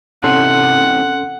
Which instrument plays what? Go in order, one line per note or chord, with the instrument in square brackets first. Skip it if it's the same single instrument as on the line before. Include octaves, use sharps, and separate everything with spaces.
[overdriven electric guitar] C3 E3 [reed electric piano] C#4 A4 C6 [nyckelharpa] F#5